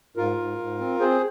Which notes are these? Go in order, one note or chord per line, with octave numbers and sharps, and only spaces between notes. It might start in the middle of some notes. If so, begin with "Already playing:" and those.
G#2 F4 A#4
G#2
G#2
C4
C4 G#4 C5